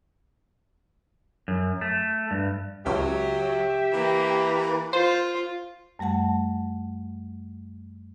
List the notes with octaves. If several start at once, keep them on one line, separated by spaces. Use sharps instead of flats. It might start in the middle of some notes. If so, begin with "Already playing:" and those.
F#2
A3
G2
C#2 F#3 G4 E5
E3 A#3
F4 C5
F#2 G3 A3 F#5 A5